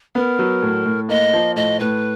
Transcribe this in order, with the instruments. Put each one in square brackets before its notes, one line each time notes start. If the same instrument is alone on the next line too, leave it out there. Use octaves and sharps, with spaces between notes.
[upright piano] B3 [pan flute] A#4
[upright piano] F#3
A2
A2
[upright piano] A#3 [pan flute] D#5
[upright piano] F3
[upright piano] A2 [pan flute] D#5
[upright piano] A2 [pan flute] B4